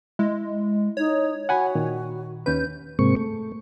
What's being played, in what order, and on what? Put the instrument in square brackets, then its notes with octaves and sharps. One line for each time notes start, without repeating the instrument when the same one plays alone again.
[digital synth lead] G#3 [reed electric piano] E4
[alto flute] D#4 [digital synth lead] C#5
[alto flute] F#4 [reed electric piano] F#5 G#5 B5
[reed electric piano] A#2 D#3
[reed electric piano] D#2 C#4 B4 [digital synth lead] G6
[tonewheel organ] G#2 C3 G#3 A#3 C4 C#6
A3